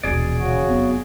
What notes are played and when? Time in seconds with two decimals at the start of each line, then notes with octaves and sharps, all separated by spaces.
0.03 D#1 B2 E3 G#4 D5
0.36 C#3 F#4
0.68 F1 F#2 B3